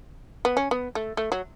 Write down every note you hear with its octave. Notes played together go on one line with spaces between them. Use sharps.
B3
C#4
B3
A3
A3
F#3